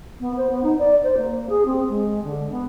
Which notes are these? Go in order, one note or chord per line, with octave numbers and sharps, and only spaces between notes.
B3
C5
B3
D#4
D5
C5
A#3
G#4
C4
G#3
D3
B3